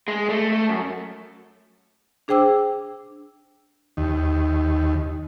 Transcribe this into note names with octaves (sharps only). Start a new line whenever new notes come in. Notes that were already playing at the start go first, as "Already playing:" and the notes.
G#3
A3
A3
F#2
D4 G#4 C5 G5 D6 E6
D#2